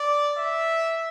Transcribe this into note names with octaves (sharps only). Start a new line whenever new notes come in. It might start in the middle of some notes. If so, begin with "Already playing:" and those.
Already playing: D5
E5